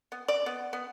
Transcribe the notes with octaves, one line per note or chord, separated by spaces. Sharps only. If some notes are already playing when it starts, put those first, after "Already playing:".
B3
D5
B3
B3